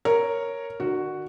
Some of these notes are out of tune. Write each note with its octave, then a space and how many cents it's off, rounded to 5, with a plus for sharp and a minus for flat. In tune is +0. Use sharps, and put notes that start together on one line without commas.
A#4 +0 C#5 +0
D3 +45 F#4 +0